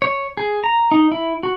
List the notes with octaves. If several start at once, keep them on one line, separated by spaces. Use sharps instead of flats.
C#5
G#4
A#5
D#4
E4
F#4